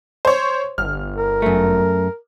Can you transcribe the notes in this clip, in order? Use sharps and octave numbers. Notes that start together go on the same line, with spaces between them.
C5 C#5
G1 F6
A#4
F#2 A3